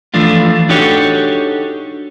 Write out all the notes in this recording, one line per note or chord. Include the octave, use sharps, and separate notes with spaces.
E3 F3 A3 D4 F4
D4 D#4 F#4 G4 A4 C#5